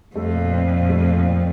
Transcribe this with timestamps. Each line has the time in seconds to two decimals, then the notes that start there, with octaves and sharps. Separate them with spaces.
0.15 F2 A3
0.34 A#2
0.52 C4
0.71 A#2
0.89 A3
1.08 A#2
1.25 C4